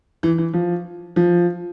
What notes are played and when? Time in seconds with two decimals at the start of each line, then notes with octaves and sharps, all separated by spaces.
0.23 E3
0.38 E3
0.54 F3
1.16 F3